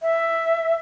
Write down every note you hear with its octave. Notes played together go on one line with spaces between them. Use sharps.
E5